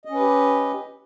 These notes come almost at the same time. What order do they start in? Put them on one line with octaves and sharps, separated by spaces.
D#5 C#4 B4 G4